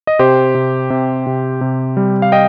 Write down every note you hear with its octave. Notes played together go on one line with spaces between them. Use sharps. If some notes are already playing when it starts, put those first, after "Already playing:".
D#5
C3 G4 C5
C3
C3
C3
C3
G3
F5
D#5 G5